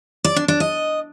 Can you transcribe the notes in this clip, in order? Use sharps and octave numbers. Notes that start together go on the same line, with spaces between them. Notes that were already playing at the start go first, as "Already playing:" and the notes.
D5
D4
D4
D#5